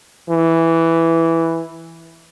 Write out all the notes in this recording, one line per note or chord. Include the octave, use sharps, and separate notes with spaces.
E3